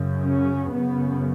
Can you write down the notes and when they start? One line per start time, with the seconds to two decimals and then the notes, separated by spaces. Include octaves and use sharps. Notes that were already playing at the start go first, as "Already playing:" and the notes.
Already playing: F#2 C#3
0.25 C#4
0.71 F#2 C#3 B3